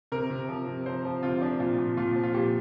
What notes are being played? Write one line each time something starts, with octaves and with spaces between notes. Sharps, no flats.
C3 A#4
C3
F3
C3
F3 C5
F3
C3 F4
F3 D4
A#2 F4
A#2
A#2 F4
F3
F4
A#2 G4